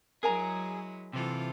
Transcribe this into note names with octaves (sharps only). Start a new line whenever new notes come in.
F#3 G#3 E4 G#4 A#4 G#5 A#5
C3 E3 F4 A4 C5